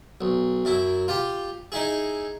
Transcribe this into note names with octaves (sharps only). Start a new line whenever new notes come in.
B1
F#2 E4
F4 G4
D#4 E4 G#4